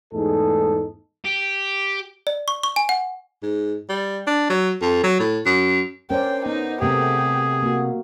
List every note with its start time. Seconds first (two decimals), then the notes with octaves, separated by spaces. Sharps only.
0.13 E2 G#2 A3 D#4 G#4 A4
1.25 G4
2.27 D5
2.48 C#6
2.63 C#6
2.76 G#5
2.89 F#5
3.43 G#2
3.89 G3
4.27 D4
4.50 F#3
4.81 F2
5.03 F#3
5.19 A2
5.46 F#2
6.10 C#4 A#4 C5 D5 G5
6.46 B3 D#4
6.82 C3 A3 B3 G4 G#4 A#4
7.63 A#3 F#4